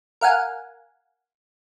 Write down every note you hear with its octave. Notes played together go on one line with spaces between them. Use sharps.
A#4 F5 F#5 G#5